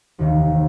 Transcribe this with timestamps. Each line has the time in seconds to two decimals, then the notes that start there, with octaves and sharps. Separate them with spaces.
0.19 F1 D#2 D#3